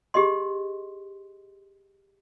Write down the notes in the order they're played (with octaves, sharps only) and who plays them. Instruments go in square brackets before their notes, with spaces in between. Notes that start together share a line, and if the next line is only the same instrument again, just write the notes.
[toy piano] G4 G#4 D#5 C6